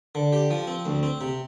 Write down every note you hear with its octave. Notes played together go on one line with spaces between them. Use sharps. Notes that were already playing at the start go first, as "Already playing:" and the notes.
D3
G4
F3
C4
D2
C4
C3